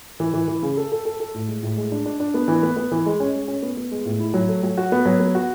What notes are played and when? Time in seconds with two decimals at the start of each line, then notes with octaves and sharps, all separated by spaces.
0.20 E3
0.34 E3
0.48 E3
0.63 C#3
0.77 A4
0.92 A4
1.05 A4
1.20 A4
1.34 A2
1.48 G#3
1.63 A2
1.77 G#3
1.92 D4
2.06 D4
2.20 D4
2.34 B3
2.48 E3
2.63 B3
2.76 B3
2.92 E3
3.06 G#3
3.20 C#4
3.35 G#3
3.48 C#4
3.63 B3
3.77 B3
3.91 G#3
4.05 A2
4.20 E4
4.34 F#3
4.48 A3
4.63 F#3
4.77 F#4
4.92 B3
5.06 F#3
5.20 B3
5.35 F#4